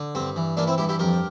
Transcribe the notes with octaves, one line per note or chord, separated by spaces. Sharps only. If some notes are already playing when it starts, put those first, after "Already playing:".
Already playing: D3
G2 C4
E3
E3 A#3 D4
C4 E4
G2 E4 G4
E4 G4
F2 G4 A#4